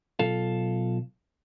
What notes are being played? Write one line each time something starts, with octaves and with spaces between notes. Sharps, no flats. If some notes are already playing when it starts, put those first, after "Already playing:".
B1 F4 A4 F5